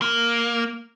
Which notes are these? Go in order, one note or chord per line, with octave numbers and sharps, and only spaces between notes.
A#3